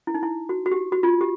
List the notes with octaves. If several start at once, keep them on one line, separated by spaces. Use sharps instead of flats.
E4
D#4
E4
F#4
F#4
G4
F#4
F4
G4